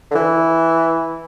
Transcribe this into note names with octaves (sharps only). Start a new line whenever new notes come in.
D3
E3